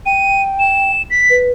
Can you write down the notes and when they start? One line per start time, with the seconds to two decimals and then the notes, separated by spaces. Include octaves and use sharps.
0.06 G5 D#7
0.59 E7
1.10 B6
1.30 B4